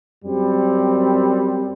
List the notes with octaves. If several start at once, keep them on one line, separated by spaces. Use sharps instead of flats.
F#2 G3 C4